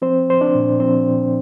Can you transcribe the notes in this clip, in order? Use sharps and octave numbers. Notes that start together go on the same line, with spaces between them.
F3 C4 C5
F3 C5
D4 D5
A#2
F3 C4 C5
A#2